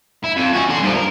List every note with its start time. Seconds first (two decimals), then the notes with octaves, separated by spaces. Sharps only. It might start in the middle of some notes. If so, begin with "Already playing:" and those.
0.24 E4
0.36 F2
0.53 C#4 F#4
0.69 D3 C6
0.83 G2 F3
0.96 A#4